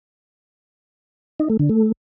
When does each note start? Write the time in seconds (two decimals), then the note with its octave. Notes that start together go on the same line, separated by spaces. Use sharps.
1.40 D#4
1.49 A3
1.59 D3
1.69 A3